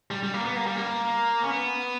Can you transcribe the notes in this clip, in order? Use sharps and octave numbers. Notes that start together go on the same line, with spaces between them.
G3
G3
A#3
B3
A#3
G3
A#3
C#4
B3